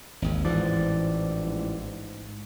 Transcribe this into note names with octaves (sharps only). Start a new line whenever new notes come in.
G#1 D#2
A1 G#2 E3 F3 D5
G#2